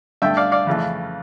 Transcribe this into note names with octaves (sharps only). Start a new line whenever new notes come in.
G2 D3 A3 E5 G5
D5 F5
D5 F5
F2 C#3 E3 A3